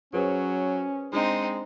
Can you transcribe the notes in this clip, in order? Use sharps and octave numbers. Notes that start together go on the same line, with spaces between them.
F#3 C#4 G#4 B4 C5
G#3 C4 D4 D#4